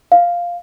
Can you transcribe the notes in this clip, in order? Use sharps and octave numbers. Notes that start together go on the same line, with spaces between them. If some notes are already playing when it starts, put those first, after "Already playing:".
F5